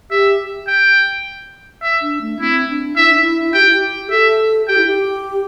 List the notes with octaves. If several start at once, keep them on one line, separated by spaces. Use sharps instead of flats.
G4 E5
G5
E5
D4
A3
C4 E4
D4
E4 E5
D4
E4
G4 G5
E4
G4
A4 E5
G4 G5
E4
G4